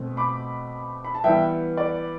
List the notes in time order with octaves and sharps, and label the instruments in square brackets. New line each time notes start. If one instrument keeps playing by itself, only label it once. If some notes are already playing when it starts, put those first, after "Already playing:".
Already playing: [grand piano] B2 A3 C4
B5 D6
B5
A5
E3 G3 B3 E5 G5
D5